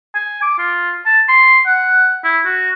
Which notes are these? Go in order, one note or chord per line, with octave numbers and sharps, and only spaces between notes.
G#5
D6
F4
A5
C6
F#5
E4
F#4